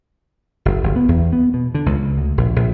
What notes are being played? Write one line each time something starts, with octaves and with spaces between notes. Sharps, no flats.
F#1
G1
B3
E2
B3
B2
D3
C#2
D2
A#1
A#1